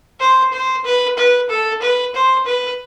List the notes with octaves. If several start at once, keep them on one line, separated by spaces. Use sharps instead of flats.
C5
C5
B4
B4
A4
B4
C5
B4